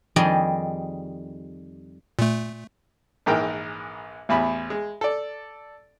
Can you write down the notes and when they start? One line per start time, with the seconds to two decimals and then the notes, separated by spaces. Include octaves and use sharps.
0.16 F2 D#3 G3 G#4 D5 D#5
2.19 A#2 A3
3.26 A#1 G#2 E3 A#4 G5
4.29 A1 E2 B5
4.70 G#3
5.01 A4 D5